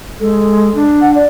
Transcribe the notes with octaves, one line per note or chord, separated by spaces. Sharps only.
G#3 A4
D4
F#5
D5